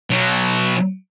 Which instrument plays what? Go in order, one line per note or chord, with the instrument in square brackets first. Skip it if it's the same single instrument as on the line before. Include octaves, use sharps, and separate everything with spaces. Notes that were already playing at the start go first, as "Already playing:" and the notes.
[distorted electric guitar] B2 F#3